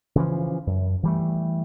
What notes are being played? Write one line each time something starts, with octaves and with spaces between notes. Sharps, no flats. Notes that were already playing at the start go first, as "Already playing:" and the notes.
C#3 E3 F3
F#2
E3 G3 A3